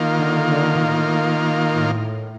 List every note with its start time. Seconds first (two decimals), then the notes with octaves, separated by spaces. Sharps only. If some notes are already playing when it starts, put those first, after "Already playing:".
Already playing: D#3 A#3 F4
0.18 D3
0.49 D3
0.80 A2
1.73 A2